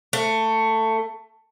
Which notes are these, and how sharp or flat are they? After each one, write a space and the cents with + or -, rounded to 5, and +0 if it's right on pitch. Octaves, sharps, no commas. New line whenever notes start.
A3 +15